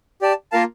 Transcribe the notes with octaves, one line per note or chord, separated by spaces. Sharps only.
G4 D5 A5
A#3 F4 A#4 F5 A5